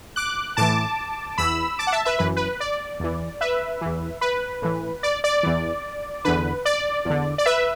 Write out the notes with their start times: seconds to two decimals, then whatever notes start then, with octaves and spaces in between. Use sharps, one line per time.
0.16 D6 F#6
0.57 A2 E3 A5 D6
1.38 E2 E3 B5 E6
1.79 A5 D6
1.87 F#5
1.92 E5 A5
2.05 B4 E5
2.19 F#2 E3 B4
2.37 B4
2.60 D5
3.00 E2 E3
3.41 B4 E5
3.81 E2 E3
4.21 B4
4.62 A2 E3
5.03 D5
5.24 D5
5.43 E2 E3
6.25 E2 D3 B4
6.65 D5
7.05 E2 D3
7.38 D5
7.46 B4 E5